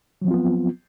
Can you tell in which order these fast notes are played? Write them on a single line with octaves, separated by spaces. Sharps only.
F#3 F3 C4 F4 B3